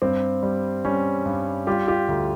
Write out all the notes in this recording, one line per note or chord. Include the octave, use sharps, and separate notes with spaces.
G2 C4
G3
G3 C#4
G2
G3 F4 G4
F4 G4
D2